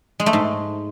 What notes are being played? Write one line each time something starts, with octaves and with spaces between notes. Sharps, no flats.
G#3
A3
G#2